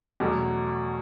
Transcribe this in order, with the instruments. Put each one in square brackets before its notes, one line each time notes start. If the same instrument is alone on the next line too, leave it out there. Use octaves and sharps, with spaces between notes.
[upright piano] E2 B2 F#3 A3